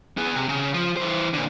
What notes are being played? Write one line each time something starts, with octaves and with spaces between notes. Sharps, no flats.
B3 G#4
C3
C#3
F3
E3 C5
A#2 D3